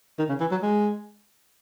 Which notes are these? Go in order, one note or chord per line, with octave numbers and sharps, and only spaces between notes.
D#3
C#3
E3
F#3
G#3